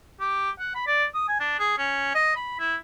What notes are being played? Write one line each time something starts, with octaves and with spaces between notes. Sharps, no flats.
G4
F#5
B5
D5
D#6
G#5
D4
G#4
C#4
D#5
B5
E4